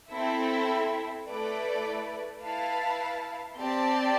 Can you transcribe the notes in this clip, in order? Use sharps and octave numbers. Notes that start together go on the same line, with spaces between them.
C4 E4 A4 E5
A3 E4 B4 D5
E4 B4 F5 A5
C4 G4 D5 A5